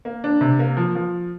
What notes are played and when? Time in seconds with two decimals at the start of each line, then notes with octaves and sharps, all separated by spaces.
0.05 A#3
0.24 D4
0.41 C3
0.59 A#3
0.77 F3
0.95 F3